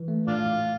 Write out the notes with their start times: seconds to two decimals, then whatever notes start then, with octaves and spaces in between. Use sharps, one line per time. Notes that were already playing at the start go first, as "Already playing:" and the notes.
Already playing: E3
0.08 A3
0.27 A2 D4 F4
0.47 A2